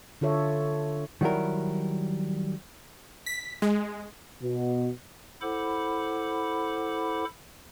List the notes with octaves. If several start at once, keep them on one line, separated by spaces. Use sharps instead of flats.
D3 F4 A4 C#5 E5
D#3 F#3 G3 E4 A#4
B6
G#3
B2
E4 A4 C5 F#5 B5 D6